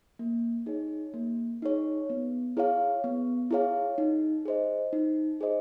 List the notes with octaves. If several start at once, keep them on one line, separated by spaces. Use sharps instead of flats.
A#3
D#4 G#4 C#5
A#3
D#4 G#4 C#5
B3
E4 G#4 C#5 F5
B3
E4 G#4 C#5 F5
D#4
G#4 C5 D#5
D#4
G#4 C5 D#5